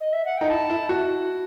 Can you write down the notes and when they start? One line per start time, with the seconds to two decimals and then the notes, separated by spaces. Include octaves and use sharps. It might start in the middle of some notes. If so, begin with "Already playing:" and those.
0.00 D#5
0.13 E5
0.25 F#5
0.37 D#4 G5
0.50 E4 A5
0.70 E4
0.89 F#4